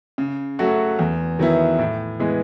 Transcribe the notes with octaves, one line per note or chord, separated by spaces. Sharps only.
C#3
F#3 A3 C#4 F#4
E2
D#3 F#3 B3 E4
A2
E3 G#3 B3